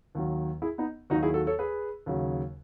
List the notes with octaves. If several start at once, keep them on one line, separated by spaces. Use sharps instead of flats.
D#2 D#3 F#3
E4 G#4
B3 D#4
D#2 D#3 F#3 D#4 F#4
E4 G#4
F#4 A4
A4 C#5
G#4 B4
D#2 C#3 F#3